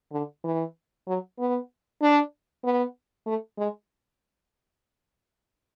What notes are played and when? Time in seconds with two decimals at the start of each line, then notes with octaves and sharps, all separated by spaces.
0.12 D3
0.44 E3
1.07 F#3
1.39 B3
2.02 D4
2.64 B3
3.26 A3
3.58 G#3